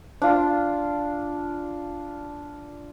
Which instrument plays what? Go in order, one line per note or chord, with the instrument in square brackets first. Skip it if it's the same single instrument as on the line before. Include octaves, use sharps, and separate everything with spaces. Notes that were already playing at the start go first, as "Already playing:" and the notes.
[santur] D4 F4